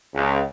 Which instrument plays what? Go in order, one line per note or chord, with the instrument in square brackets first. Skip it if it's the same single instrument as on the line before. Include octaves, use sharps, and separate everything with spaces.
[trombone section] C#2